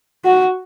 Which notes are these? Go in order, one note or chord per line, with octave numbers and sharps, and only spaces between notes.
F#4